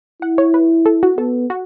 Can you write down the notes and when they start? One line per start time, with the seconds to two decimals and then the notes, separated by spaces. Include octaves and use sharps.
0.22 E4 F#5
0.38 C#5
0.54 B4
0.86 A4
1.03 F#4
1.18 B3 A4
1.50 F#4